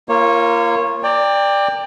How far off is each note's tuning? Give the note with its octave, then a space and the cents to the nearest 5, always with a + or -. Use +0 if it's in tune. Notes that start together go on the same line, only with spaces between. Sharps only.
A#3 +0 F4 -35 C#5 -20
D5 +5 G5 +25 A#5 -45